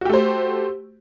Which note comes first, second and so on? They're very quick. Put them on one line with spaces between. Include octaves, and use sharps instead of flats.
F#4 G4 A3 C5